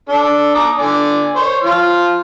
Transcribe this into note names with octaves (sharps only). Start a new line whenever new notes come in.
D4 A4
A#5 D6 D#6
D3 D5 G#5
C5 C#5
F3 F4 F6